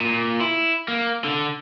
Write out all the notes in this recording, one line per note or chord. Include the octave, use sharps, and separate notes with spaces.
A#2
E4
A#3
D3